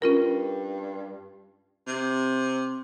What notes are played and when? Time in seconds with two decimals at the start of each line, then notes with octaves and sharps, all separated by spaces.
0.02 G2 C#4 F4 A#4
1.87 C3